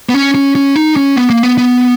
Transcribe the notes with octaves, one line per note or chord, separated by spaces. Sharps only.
B3
C#4
C#4
C#4
D#4
C#4
B3
A#3
B3
B3